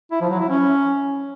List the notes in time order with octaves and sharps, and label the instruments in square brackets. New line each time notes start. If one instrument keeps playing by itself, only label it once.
[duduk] E4
F3
F#3
E4
C#4